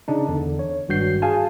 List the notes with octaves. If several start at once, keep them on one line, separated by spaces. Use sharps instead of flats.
C#3 D4 D#4
E2 D3
C#5
G#1 G2 F#4 G6 C7
F#4 G#4 F5 G#5 A5